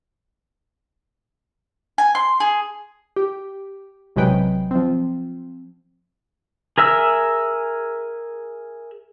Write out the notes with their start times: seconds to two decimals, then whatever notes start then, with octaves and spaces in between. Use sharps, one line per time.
1.98 G#5
2.15 C6
2.40 G#4
3.16 G4
4.16 A1 C3 F#3 G#3 B4 G5
4.71 F3 C4
6.78 G#4 A#4 E5 E6